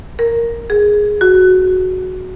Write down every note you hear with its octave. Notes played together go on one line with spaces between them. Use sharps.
A#4
G#4
F#4